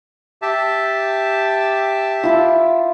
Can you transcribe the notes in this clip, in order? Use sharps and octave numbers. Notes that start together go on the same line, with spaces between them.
G4 E5 A5
E4 F4